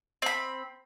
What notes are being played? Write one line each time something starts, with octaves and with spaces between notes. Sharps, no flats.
C4 B5